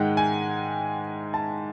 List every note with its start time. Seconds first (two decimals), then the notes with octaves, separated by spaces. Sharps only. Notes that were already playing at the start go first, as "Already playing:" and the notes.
Already playing: G#2 D#3 G#3 F#5 G5
0.17 G#5
1.34 A5